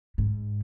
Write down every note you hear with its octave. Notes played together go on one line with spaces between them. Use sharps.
G#2